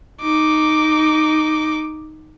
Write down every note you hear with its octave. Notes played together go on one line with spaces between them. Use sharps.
D#4 D6